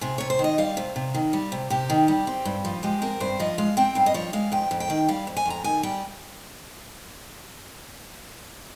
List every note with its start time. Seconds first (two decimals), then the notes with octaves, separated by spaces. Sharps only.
0.01 C3 G#4
0.18 C3 C#5
0.30 C5
0.39 D#3
0.44 D#5
0.58 G3 F5
0.77 C3
0.96 C3
1.14 D#3
1.33 G3
1.52 C3
1.70 C3 G4
1.90 D#3
2.08 G3
2.27 C4
2.45 G2
2.65 F3
2.83 G#3 G4
3.02 C4 A#4
3.20 G2 C5
3.40 F3 D#5
3.58 G#3 F5
3.77 C4 G5
3.95 G2 F5
4.06 D#5
4.14 F3 C#5
4.33 G#3 F5
4.52 F2 G5
4.71 F2
4.80 G5
4.90 D#3
5.08 G3 F5
5.27 F2
5.37 G#5
5.46 F2 A#5
5.64 D#3 G#5
5.83 G3 G5